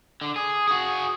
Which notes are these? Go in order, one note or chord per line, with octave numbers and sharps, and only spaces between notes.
D3
G#4
F#4 G#4